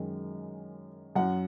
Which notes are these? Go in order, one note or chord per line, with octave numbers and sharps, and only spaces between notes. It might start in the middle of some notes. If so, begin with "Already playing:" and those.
Already playing: F#2 D#3 G#3
F#2 F#3 F#5